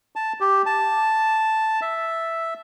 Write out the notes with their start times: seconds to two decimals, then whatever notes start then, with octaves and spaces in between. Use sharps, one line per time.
0.16 A5
0.41 G4
0.66 A5
1.82 E5